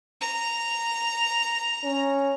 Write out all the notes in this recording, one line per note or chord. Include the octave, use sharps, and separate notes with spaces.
A#5
C#4